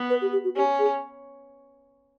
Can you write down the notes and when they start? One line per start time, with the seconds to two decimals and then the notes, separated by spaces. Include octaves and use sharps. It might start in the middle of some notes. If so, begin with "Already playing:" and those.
Already playing: B3
0.10 B4
0.21 G4
0.33 G4
0.44 F#4
0.56 C#4 G4
0.79 G#4